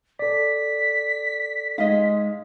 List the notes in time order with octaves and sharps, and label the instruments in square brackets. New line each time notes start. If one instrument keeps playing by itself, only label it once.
[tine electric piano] A4 D5 [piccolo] B6
[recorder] G#3 [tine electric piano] D#4 [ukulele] D#5 F5